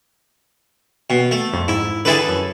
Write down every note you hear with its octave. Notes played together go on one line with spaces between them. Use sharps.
B2
A3
F2
G#2 E4
D3 E4 G#4 A4 B4
F#2